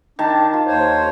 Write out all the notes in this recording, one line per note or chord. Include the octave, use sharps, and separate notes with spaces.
D#3 D4 A5
F4
D#2 C5 C#5